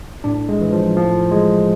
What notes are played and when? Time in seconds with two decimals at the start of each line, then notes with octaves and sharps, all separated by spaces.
0.24 A2 D4
0.49 G#3
0.61 E3
0.72 F3
0.95 A2 F3
1.31 E3 G#3